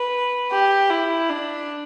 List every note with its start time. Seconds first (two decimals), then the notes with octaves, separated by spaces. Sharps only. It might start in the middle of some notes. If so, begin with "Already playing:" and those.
Already playing: B4
0.51 G4
0.90 E4
1.30 D4